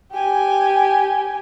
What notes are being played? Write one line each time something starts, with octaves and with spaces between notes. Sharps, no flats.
G4 G#5